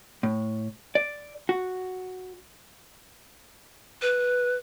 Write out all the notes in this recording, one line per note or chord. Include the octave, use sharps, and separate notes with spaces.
A2
D5
F#4
B4